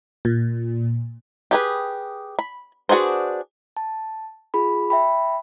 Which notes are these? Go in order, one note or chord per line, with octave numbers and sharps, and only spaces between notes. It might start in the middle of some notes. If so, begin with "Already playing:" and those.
A#2
G4 G#4 B4
B5
D4 F#4 G#4 B4 C5
A5
F4 G#4 B5
E5 G5 B5